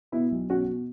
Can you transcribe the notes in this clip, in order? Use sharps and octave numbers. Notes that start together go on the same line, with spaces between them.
B2 B3 E4
B1
B2 C#4 F#4
B2